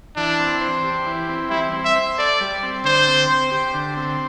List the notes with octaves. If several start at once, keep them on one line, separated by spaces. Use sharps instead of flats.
E3 D4
C4
C5
G4
E3
C4
G3 E4
C4
E5
C5
A4 D5
G3
C4
D3 C5
C4
C5
G4
D3
C4